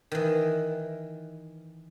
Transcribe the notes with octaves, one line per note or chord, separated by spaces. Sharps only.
D#3 E3